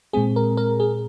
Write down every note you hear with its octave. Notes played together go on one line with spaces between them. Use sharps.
A#2 G#3 C4 G#4
A#4
A#4
G#4